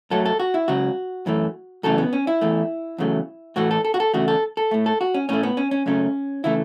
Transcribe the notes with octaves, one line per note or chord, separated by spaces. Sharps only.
F#2 F#3 A3 A4
A4
F#4
E4
C#2 C#3 F#3 F#4
F#2 E3 A3
F#2 C#3 E3 A3 A4
B3
C#4
E4
E2 E3 A3
E2 C#3 F#3 A3
A2 E3 A3 F#4
A4
A4
F#4
A4
E2 C#3 A3 F#4
A4
A4
A2 A3
A4
F#4
C#4
A2 A3 C#4
B3
C#4
C#4
F#2 C#3 A3 C#4
C#3 E3 A3 E4